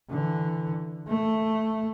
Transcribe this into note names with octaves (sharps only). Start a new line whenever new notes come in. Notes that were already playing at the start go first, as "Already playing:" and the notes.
D3 E3
A3